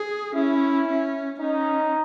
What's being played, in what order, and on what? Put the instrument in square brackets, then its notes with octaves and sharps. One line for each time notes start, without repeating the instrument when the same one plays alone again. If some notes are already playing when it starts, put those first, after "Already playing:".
Already playing: [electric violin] G#4
[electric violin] C#4 [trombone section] E4
[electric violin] C#4
[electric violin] C#4 [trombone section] D#4